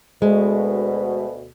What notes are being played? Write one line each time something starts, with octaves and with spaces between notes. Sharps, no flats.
D2 B2 G#3